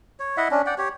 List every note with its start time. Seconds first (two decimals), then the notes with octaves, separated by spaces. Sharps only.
0.20 C#5
0.37 E4 D#5 E5 F#5
0.51 C#4 D4
0.66 D5 F#5 G5
0.78 G4 C#5